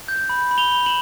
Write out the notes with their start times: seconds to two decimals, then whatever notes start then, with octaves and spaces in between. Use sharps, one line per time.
0.08 G6
0.29 B5
0.51 B5
0.58 F7 G7
0.72 B5
0.86 E7 F#7